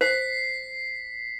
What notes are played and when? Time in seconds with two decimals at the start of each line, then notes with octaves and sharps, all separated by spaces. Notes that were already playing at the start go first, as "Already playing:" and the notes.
0.01 C5 B6 C7